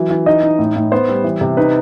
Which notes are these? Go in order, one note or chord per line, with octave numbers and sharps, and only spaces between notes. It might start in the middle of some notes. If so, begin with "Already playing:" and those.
Already playing: E3 F#3
E3
D#4 D#5
D#4
A2
A2
B3 C5
G3
E3
C3
D#4 B4